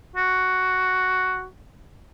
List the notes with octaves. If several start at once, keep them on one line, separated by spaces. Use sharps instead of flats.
F#4